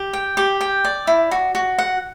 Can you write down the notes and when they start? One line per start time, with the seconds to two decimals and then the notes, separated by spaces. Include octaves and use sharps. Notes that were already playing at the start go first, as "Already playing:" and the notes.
Already playing: G4
0.13 G5
0.37 G4
0.61 G5
0.84 D5
1.07 E4
1.31 F#4
1.55 F#4
1.79 F#5